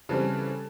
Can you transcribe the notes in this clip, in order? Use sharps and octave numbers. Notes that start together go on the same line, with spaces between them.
C#3 E3 G3 C4 A4